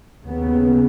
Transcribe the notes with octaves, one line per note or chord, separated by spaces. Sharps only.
D#2 C#3 B3